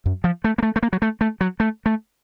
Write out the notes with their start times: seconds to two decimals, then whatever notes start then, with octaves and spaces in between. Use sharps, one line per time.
0.06 F#2
0.24 F3
0.44 A3
0.58 A#3
0.63 A3
0.76 A3
0.83 A#3
0.93 F#3
1.02 A3
1.21 A3
1.41 F#3
1.60 A3
1.86 A3